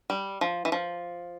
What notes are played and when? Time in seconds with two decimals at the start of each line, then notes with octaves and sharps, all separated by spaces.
0.10 G3
0.41 F3
0.65 E3
0.72 F3